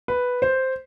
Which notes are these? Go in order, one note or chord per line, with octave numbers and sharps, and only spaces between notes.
B4
C5